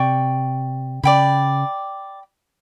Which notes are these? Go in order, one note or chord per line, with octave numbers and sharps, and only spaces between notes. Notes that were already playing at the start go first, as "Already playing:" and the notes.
Already playing: C3 D5 G5 C#6
C#3 D5 G5 B5